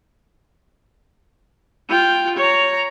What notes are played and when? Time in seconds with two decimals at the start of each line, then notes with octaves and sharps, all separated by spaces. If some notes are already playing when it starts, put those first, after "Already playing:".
1.89 F4 G5
2.36 C#5 A#5